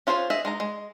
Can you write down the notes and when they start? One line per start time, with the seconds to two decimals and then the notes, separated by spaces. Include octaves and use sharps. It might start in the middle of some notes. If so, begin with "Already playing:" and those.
0.07 C#4 F4 G#4 B4 C5
0.30 G#4 D#5 E5
0.45 G#3 D#4 A#5
0.60 G#3